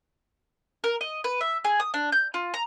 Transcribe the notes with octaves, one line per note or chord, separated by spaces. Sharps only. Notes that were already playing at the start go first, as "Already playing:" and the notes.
A#4
D#5
B4
E5
G#4
D#6
D4
G6
F4
A#5